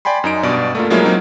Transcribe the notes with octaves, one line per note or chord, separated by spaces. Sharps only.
D5 G5 G#5 B5 C6
F#2 D#4 D7
G2 B2 D5
A3 A#3 F4
F3 F#3 G#3 A#3 C#4 E4
F#3 A#3 C4 C#4 D#4